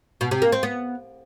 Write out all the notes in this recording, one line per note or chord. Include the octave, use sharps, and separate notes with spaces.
B2
C3
A#3
C4
B3